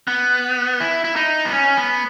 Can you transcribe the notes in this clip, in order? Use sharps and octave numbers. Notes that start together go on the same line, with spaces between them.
B3
E4
E4
D#4
B3
C#4
B3